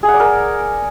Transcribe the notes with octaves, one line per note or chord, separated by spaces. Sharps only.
G#4
F#5
D5
A#4